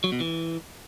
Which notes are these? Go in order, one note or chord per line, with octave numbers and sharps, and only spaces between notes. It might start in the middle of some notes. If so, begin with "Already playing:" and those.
F#3
B2
E3